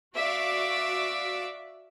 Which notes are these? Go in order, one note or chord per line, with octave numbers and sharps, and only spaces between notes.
F#4 D5 E5 F5 D6